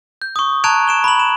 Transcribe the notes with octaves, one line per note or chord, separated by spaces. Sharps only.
G6
C#6 D#6
A5 A#5 F#6 G#6 D7 F7
D7 E7 G7
B5 F#7
E7